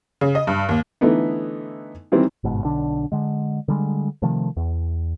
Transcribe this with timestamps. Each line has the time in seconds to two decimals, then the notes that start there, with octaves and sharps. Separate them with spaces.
0.21 C#3
0.35 D#5
0.47 G2
0.69 D#2
1.01 D3 E3 A3 B3 D#4
2.12 D#3 E3 G3 C4
2.44 G1 G#2 B2
2.64 B1 D3 D4
3.12 D3 G#3
3.68 D3 G3 G#3
4.22 C3 D#3 F3 A3
4.57 E2